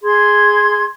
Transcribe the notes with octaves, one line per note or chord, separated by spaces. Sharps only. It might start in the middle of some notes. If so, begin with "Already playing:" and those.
G#4 C6 G#6